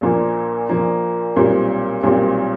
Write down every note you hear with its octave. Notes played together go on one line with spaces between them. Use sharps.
A#1 A#2 F3 A#3
A#1 A#2 F3 A#3
B1 A#2 G3 C4 F4
B1 A#2 G3 C4 F4